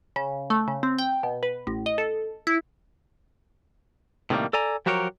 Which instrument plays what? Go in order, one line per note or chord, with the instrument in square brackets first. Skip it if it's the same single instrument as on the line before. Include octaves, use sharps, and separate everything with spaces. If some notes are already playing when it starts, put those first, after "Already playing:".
[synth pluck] C#3
A3
C#3
C4
G5
B2
B4
A1
D#5
A4
E4
[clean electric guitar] A2 C3 D#3 F#3 G3 A#3
A4 D5 G#5 A#5
F3 F#3 F#4 G4 A#4 C#5